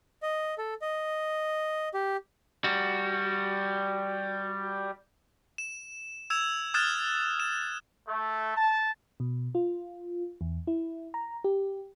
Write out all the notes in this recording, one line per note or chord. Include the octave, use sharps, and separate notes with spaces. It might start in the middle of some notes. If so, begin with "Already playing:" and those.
D#5
A4
D#5
G4
G3 F#4
E7
E6 G#6 E7 F7
D#6 F6 F#6 G#6 A6 E7
E7
A3
A5
B2
F4
E2
E4
A#5
G4